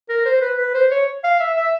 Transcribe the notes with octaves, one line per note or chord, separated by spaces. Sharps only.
A#4
C5
B4
B4
C5
C#5
F5
E5
E5